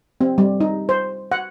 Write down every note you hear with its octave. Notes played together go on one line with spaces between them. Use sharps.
C4
G3
D#4
C5
F#5